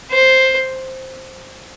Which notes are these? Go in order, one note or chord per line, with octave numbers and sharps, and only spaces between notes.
C5